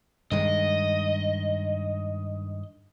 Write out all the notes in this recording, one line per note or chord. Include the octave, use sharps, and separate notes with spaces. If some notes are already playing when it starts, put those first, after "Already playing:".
G2 D#3 G#3 D#5